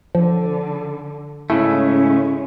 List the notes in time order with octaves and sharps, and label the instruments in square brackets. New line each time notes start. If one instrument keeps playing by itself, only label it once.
[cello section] D3 [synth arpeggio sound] F3
[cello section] G#2 G#3 C#4 [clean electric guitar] C#3 A3 [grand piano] E4 [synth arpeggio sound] A5